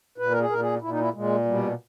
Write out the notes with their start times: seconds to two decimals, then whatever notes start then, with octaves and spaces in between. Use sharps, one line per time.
0.18 A#2 B4
0.31 A#4
0.39 G#4
0.49 A#2 A#4
0.60 G#4
0.81 A#2 E4
0.91 D#4
1.00 E4
1.13 A#2 G#3
1.46 B2 G3